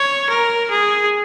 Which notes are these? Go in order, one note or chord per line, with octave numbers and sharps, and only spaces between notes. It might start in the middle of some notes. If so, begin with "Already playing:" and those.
Already playing: C#5
A#4
G#4